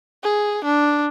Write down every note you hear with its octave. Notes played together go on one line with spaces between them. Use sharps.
G#4
D4